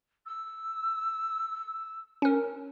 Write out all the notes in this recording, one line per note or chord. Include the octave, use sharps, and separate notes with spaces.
E6
C#4 A#4